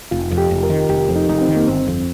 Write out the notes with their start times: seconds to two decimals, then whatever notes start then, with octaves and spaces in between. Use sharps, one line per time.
0.11 F1 F4
0.31 F2
0.38 G4
0.51 F1
0.63 A#4
0.70 D#3
0.89 F1 G4
1.09 F2
1.16 D#4
1.29 F1 D#4
1.41 C4
1.48 D#3
1.56 A#3
1.67 G1 C4
1.88 F2